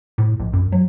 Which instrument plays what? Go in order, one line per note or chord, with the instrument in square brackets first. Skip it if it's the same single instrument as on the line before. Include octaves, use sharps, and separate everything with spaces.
[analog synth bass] A2
A#1
F#2
F#3